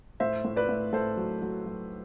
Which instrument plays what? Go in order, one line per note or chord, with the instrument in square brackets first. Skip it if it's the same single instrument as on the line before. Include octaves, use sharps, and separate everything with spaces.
[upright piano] A2 C5 E5
A2
B4 D5
A2
A2 A4 C5
F#3
F#3
F#3